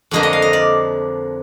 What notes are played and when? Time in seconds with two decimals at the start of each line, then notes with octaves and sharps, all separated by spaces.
0.11 F2 D3 F3 A#3 D#5
0.23 D#5
0.33 F5
0.42 D#5
0.53 D5